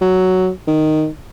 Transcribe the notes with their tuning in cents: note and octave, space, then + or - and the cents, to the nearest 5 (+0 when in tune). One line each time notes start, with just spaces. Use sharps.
F#3 +5
D#3 -5